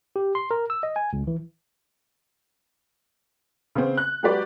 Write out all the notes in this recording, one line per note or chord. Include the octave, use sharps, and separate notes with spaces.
G4
C6
A#4
E6
D#5
G#5
C#2
E3
C#3 B3 C4
F#6
F#3 G#3 F#4 G4 B4 D5